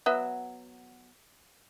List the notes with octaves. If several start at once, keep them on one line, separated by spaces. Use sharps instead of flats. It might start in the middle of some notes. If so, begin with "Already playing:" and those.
F#3 B3 E5